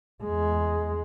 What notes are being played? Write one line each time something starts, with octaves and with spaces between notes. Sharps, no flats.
E2 G#3